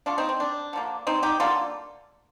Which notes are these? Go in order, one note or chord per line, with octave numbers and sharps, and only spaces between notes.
D3 A3 D4 F4
C4 D#4
C4
D4
D3 F3 A#3
C4 D#4
D#4 G4
D3 G3 A#3 F4 A4